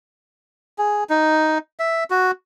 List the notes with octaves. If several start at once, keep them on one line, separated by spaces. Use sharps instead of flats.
G#4
D#4
E5
F#4